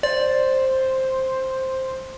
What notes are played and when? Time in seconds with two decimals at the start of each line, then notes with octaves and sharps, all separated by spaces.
0.03 C5 D5